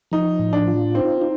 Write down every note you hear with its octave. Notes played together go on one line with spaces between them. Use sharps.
F3 D#4
A2
D4
F4
C4 D#4
D#4